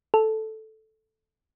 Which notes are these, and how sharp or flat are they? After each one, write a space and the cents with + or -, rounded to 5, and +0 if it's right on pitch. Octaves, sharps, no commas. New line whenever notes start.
A4 -5